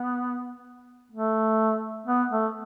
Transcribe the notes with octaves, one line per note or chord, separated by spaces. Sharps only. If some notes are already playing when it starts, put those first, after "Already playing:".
Already playing: B3
A3
B3
A3